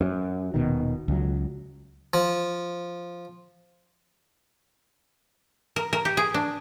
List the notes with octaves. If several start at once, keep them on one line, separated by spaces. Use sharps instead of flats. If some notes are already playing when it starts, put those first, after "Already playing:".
F#2
D#1 B2 D#3
C#2 F#3
F3
A#4
A#4
G4
G#4
D4